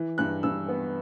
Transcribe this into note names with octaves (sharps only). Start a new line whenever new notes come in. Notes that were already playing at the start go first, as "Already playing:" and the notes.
Already playing: E3
G2 F#6
G2 E6
B3